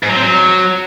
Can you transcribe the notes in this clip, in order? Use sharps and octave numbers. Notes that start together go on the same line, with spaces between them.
G#2
F#3
C4
F#3